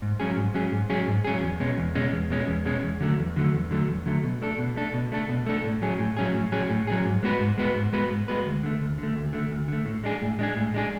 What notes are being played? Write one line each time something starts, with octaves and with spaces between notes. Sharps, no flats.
G#2
F#3 C#4 G#4
G#2
F#3 C#4 G#4
G#2
F#3 C#4 G#4
G#2
F#3 C#4 G#4
E2
B2 G#3 C#4
E2
B2 G#3 C#4
E2
B2 G#3 C#4
E2
B2 G#3 C#4
E2
D3 F#3 A3
E2
D3 F#3 A3
E2
D3 F#3 A3
E2
D3 F#3 A3
B2
A3 D4 A4
B2
A3 D4 A4
B2
A3 D4 A4
B2
A3 D4 A4
A2
F#3 C#4 G#4
A2
F#3 C#4 G#4
A2
F#3 C#4 G#4
A2
F#3 C#4 G#4
G#2
G#3 B3 F#4 B4
G#2
G#3 B3 F#4 B4
G#2
G#3 B3 F#4 B4
G#2
G#3 B3 F#4 B4
D2
D3 A3
D2
D3 A3
D2
D3 A3
D2
D3 A3
A2
G#3 D4 G#4
A2
G#3 D4 G#4
A2
G#3 D4 G#4